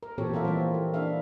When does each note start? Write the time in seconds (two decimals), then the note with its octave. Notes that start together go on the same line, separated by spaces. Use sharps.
0.03 A#4
0.18 A#2 E3 C4 G4 A4 C#5
0.33 F3 C4 F4 F#4 A#4 E5
0.45 E3 G3 A#3
0.74 A4
0.94 D4 E4 E5 F5